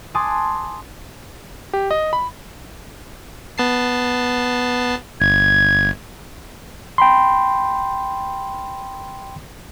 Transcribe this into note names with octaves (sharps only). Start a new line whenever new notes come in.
G#5 A5 C6 D6 D#6 F#6
G4
D#5
B5
B3 A5 C7
G1 G#6
G5 B5 C6